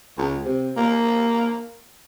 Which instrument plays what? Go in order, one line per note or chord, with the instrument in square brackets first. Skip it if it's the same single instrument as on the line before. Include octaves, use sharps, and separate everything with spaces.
[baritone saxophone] C#2
C3
A#3